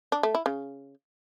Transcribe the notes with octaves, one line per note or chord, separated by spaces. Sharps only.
D4
A3
E4
C#3